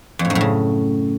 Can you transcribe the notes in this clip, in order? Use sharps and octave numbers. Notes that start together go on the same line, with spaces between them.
F2
A2
F#2
A2
C#3